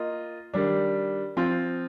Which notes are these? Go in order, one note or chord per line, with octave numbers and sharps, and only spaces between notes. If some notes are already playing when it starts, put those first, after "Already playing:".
Already playing: A#3 F4 D#5
D#3 G3 D4
F3 C4 F4